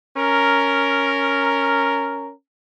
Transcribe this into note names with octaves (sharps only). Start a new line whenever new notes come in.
C#4 A#4